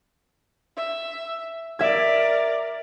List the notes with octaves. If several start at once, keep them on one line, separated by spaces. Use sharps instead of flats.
E5
A#4 D5 E5 G#6